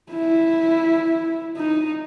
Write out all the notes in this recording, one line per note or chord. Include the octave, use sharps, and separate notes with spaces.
E4
D#4